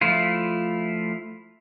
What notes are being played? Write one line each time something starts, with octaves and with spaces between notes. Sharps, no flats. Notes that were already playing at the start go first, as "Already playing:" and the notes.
F3 A3 E4 F4